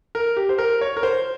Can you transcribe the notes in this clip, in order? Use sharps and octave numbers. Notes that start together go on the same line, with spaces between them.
A#4
G4
C5
A#4
C#5
A#4
C5